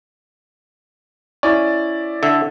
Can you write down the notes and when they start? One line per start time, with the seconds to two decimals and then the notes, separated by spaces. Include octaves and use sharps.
1.43 C#4 E4 D5
2.23 D3 E5